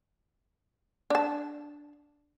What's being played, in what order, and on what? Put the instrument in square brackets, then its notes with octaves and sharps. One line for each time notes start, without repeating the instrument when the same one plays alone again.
[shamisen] D4 A5